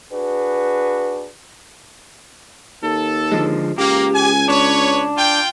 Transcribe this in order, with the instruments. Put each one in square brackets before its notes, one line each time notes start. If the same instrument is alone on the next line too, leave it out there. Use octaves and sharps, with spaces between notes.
[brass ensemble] D4 F#4 G#4 B4
[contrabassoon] D#2 [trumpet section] A4
[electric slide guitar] D3 F3 G#3
[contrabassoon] C#2 [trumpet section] A#3 [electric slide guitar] G4
[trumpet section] G#5
[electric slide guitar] D4 [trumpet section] B4 C#5
[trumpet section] F4 G5